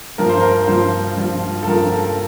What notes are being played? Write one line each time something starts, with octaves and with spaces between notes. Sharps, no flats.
G2 F3 A#4
C5
A#4
G2 F3 C5
G2 F3
A4
G2 F3 A#4